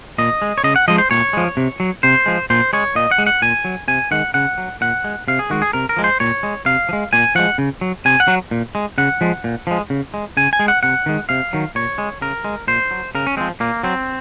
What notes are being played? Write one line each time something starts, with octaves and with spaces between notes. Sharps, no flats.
A#2 D#5
G#3
C#5
C#3 D#5
F#5
F3 G#3 D#5
C5
A#2 C#5
F3 G#3
C3
F#3
C3 C5
F3 G#3
A#2 C5
G#3 C#5
A#2 D#5
F#5
G#3
F#5
A#2 G#5
F#3
C3 G#5
D#3 G#3 F#5
C#3 F#5
F#3
A#2 F#5
G#3
C3 F5
G#4
D#3 G#3 F#4
G#4
C3 A#4
A#4
F3 G#3
C5
A#2 C#5
G#3
C3 F5
F3
G#3
A#2 G#5
F3 G#3 F#5
C#3
F#3
C3 G#5
F#5
F#3
A#2
G#3
C#3 F#5
F3 G#3
A#2
F3 G#3
C#3
G#3
C#3 G#5
G#5
G#3
F#5
C3 F#5
D#3 G#3
C3 F5
D#3 F#3
A#2 C#5
G#3
C#3 A#4
G#3
A#2 C5
F#3
C#3 A#4
C#4
F3 G#3 C4
A#2 A#3
F#3 C4